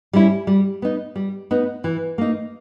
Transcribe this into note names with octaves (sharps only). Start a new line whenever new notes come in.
G3 C#4 E4
G3
B3 D#4
G3
B3 D#4
E3
A#3 D#4